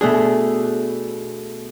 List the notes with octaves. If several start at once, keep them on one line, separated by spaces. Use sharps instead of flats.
B2 A3 D4 G#4